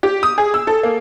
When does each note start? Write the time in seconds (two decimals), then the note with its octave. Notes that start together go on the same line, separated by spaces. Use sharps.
0.03 G4
0.23 D#6
0.38 G#4
0.54 E6
0.67 A4
0.83 A#3